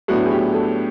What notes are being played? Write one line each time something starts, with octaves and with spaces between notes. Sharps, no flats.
A2 F#3 B3 D4 F#4
G#4
G4
A4